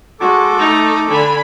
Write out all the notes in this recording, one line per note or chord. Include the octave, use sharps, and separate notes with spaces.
G#3 F#4 A4 D6
A3 D#4
D3 D4 G#5 B5